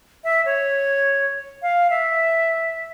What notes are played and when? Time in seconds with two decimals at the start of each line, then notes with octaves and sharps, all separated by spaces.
0.24 E5
0.46 C#5
1.62 F5
1.90 E5